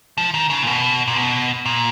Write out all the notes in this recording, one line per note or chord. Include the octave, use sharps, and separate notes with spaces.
F3
D#3
C#3
A#2
B2
A#2
B2
A#2